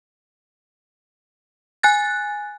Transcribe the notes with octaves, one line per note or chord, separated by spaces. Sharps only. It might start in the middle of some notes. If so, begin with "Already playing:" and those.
G#5 F#6 A6